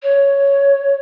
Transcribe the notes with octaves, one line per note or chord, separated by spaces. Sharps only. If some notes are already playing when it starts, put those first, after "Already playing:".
C#5